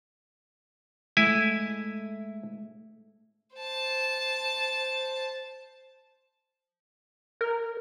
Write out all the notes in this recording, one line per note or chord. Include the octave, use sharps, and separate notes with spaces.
G#3 A3 E4 G#5
C5 A5
A#4